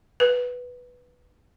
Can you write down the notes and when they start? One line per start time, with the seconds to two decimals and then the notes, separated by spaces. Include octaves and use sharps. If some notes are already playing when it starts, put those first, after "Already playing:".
0.20 B4